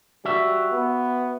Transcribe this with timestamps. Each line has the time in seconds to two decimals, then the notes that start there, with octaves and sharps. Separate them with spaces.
0.25 G3 F#4 E5
0.72 B3